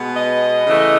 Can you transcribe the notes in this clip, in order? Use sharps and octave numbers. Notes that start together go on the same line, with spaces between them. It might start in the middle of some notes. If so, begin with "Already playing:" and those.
Already playing: B2 G#3 B3
D#5
C#3 E3 A3